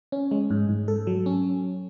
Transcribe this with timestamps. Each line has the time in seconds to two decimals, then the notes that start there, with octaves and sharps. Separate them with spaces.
0.12 C#4
0.31 G#3
0.50 G#2
0.69 G#2
0.88 A4
1.07 F#3
1.26 C#4